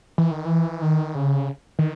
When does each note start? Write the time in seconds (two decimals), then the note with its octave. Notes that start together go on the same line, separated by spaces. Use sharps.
0.18 E3
0.31 D#3
0.45 E3
0.82 D#3
1.15 C#3
1.79 D#3